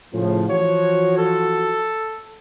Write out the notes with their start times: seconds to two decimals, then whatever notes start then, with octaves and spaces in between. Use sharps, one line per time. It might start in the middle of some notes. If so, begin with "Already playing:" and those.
0.13 A2 C#3 F3
0.50 E3 F3 F#4 C#5
1.18 A4